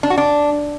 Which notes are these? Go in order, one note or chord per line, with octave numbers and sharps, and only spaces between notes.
D4
F#4
D4